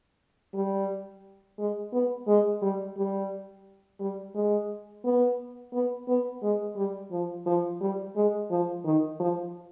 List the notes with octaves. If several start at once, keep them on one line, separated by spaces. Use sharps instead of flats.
G3
G#3
B3
G#3
G3
G3
G3
G#3
B3
B3
B3
G#3
G3
F3
F3
G3
G#3
F3
D#3
F3